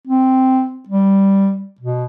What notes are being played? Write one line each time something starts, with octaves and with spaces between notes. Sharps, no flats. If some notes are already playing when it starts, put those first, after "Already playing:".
C4
G3
B2